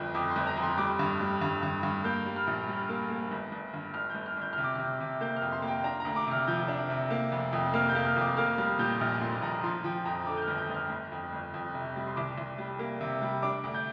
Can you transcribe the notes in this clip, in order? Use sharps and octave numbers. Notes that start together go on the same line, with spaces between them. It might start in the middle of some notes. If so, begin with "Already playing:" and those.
Already playing: G1 F2 F3
F2 D6
C6
G1
A#5
F2
C6
G3 D6
G2
G3
G2
G2
G2
A#3 G6
G3
F6
A#1
G3
A#3
A#3
G1
G1
G2
G1 F6
G1 G6
F6
G1 G6
C3 F6
D6
C3 F6
C3
A#3 G6
F6
F2
C6
A#3
G5
D4 A#5
D2 A#5
D6
C3 F6
F3 G6
D4
C3
A#3
F1
F2
A#3 F6
G6
A#3
F6
F2
D6
A#3 F6
G3 F6
A#2 G6
A#1 F6
A#2 C6
A#1 A#5
F3 C6
F3 G5
F2 A#5
D3 D6
G6
F6
G1
G6
G1
F6
G1
F2
G1
F2
C3
G3
C6
C2 D6
C2
G3
A#3
C3
G3
D4 D6
D2
G6